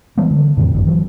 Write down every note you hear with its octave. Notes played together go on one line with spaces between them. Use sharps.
E3 G3 G#3 B3
D3
F2 A2 C3 D#3
D1 G#1 F#2
E3 F#3